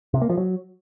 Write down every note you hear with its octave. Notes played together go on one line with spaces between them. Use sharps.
C3
A#3
F3
F#3